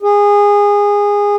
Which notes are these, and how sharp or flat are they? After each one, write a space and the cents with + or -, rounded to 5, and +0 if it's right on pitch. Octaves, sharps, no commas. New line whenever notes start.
G#4 -20